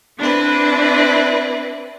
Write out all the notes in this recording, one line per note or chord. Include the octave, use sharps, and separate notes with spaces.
C4 D4 E4 B4